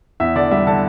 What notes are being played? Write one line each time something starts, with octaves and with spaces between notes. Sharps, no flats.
E2 E5
D3 D5
G3 E5
D3 A5